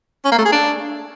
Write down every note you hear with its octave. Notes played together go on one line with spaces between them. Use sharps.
C#4
A#3
A3
G#4
D4